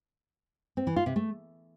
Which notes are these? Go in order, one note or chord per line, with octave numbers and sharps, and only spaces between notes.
C4
E3
F4
C3
A3